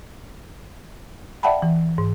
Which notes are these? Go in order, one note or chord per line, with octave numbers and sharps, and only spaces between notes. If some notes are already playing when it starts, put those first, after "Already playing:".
D5 E5 F#5 G5 A5 B5
E3
G#2